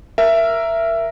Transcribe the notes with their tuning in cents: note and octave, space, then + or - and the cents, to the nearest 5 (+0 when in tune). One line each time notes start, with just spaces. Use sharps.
A#4 +0 E5 +15